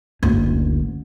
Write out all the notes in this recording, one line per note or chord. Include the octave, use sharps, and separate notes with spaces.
F#1 D2